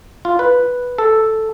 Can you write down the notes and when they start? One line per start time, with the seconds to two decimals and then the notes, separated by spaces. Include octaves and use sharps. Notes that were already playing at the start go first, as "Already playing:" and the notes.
0.25 F4
0.39 B4
0.98 A4